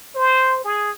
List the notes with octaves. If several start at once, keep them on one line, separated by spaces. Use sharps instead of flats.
C5
G#4